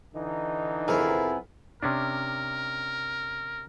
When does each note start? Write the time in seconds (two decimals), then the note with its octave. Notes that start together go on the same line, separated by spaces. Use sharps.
0.14 D3 E3 D#4
0.88 F2 C3 B3 E4 G#4 A#4 F5
1.83 C3 C#4 D4 A#4